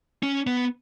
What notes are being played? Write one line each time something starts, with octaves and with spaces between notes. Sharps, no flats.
C#4
B3